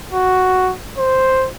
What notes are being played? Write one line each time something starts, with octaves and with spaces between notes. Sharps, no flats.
F#4
C5